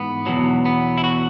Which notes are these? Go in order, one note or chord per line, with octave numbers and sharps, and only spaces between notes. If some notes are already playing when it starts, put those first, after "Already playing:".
Already playing: G#2 E3 B3
E2 B2 F#3
B3
E4
F#4